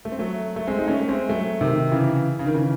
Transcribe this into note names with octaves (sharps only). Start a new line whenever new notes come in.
A3
C4
F#3 A3
A3
G#3 C4
D#4
A3 C#4
A3
G#3 C4
F#3 A3
C3 D#3
C#3 E3
C#3
D#3
C#3 E3